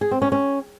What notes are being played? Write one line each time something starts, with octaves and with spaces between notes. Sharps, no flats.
G#4
C4
C#4
C#4